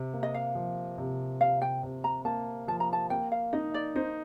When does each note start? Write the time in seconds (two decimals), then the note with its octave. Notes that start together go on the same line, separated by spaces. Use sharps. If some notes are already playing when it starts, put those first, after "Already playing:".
Already playing: C3
0.14 A#3
0.23 D#5
0.34 F5
0.55 F3
0.98 C3
1.41 C3 F5
1.62 G5
1.83 C3
2.04 A#5
2.25 A#3 A5
2.68 F3 A5
2.80 A#5
2.93 A5
3.10 A#3 G5
3.32 F5
3.53 D#4 D#5
3.74 D5
3.96 D#4 C5